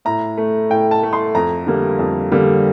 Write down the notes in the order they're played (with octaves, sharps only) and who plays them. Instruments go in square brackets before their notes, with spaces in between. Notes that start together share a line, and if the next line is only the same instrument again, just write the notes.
[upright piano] A2 A#5
A3
A2 G5
A5
A3
C6
F2 A#5
D3 G3 A#3
F2
D3 G3 A#3